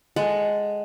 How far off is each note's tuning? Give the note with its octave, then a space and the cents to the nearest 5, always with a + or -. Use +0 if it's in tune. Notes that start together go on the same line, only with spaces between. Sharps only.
G#3 +0 A4 +0 F#5 +10